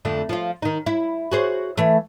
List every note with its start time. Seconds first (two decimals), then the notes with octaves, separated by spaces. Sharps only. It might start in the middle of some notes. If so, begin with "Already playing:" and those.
0.05 F2 D3 A3
0.29 F3 F4
0.62 D#3 D#4
0.86 E4
1.31 F#4 G#4 C5
1.78 E3 A3